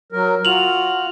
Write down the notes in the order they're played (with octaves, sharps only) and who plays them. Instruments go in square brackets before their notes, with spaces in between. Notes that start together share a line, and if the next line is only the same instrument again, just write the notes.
[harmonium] F#3 A#4
[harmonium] F4 F#4 [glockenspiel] F7 F#7